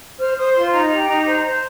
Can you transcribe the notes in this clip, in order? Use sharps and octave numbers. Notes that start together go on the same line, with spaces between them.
C5 F6
C5 D#6
F4 C6
D#4 A#5
G4
D#4
C5
C5